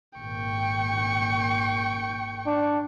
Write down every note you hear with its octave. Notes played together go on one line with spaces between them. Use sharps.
G#1 A#2 G5 C#6
D4